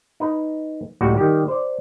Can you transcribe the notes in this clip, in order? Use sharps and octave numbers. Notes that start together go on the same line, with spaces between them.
D#4 B4
C#2 A2 F#3 G3 F#4
D#3 G3 G4
C5 D5